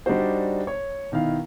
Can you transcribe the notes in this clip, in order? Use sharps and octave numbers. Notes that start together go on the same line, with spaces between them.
G3 D4 D#4 F#4 C5
C#5
B2 D#3 E4 F5